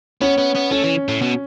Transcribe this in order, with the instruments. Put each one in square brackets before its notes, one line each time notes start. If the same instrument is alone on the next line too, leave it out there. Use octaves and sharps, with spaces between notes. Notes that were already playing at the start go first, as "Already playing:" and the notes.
[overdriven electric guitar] B3 [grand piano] C#4
[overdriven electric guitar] B3
B3
[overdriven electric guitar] A3 [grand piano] C#4
[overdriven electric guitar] E3
A2
B2